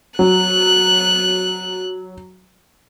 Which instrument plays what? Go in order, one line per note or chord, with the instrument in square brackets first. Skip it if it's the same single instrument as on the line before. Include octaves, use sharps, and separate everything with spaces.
[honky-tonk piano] F#3 [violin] F#6